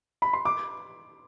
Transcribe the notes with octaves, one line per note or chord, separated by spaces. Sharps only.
B5
C6
D6